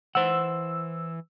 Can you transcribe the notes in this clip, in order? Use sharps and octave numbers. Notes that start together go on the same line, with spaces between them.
E3 C5 F#5 E6